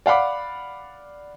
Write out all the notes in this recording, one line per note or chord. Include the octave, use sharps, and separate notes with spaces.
D5 F5 F#5 B5 D6